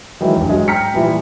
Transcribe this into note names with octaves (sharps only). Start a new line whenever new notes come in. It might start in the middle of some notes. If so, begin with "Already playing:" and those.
D#3 E3 F#3 G#3
A1 G2
G#2 F#3 G#3
G5 A#5 F6 B6 C#7
A#2 E3 F3 G3